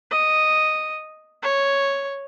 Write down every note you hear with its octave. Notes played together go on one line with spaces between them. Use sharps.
D#5
C#5